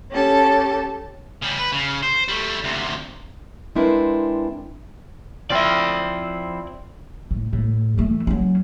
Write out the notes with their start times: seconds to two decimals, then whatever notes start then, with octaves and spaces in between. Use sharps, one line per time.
0.11 C#4 G4 A4 A5
1.42 C#3 G3
1.59 B4
1.72 C#3
2.03 C5
2.28 G3 A3
2.64 D2 C3
3.75 G#3 C4 D4 E4 A#4 B4
5.50 F3 C4 E4 D5 E5
7.31 A2
7.53 A2
7.98 E3 A3
8.27 F#3 C#4